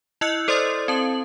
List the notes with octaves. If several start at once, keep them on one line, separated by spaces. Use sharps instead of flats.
E4 D#5 E6 F#6 C#7
A4 C5 D5 C6 D#6 A6
C4 A5 F#7